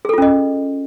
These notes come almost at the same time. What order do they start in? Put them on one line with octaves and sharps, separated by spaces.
G#4 A4 F4 C#4 D#5